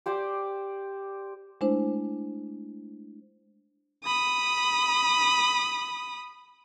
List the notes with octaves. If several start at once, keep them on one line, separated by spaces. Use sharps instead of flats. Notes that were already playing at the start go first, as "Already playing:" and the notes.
G4 C5 D5 G5
G#3 A3 D4 E4 C5
B5 D#6